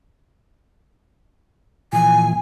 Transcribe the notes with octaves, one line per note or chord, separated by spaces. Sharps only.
A#2 E3 F3 G#5